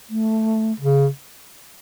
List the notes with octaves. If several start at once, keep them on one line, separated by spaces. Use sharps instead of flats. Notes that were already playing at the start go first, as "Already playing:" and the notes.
A3
C#3